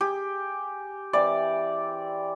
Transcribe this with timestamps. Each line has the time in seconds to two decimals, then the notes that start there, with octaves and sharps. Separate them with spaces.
0.01 G4 G#4
1.13 E3 C4 G4 D5